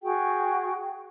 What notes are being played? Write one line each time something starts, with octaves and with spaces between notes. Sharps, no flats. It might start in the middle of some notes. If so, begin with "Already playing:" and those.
F#4 G#4 G5